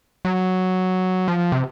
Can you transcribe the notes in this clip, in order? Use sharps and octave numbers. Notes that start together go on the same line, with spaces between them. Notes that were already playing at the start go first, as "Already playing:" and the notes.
F#3
F3
C3